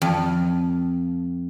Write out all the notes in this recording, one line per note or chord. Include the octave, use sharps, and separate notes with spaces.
F2